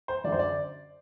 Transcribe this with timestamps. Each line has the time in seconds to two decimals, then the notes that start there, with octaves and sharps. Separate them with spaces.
0.08 C5
0.24 F#2 D3 D5
0.32 C5
0.39 D5